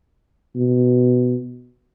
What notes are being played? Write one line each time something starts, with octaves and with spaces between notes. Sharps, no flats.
B2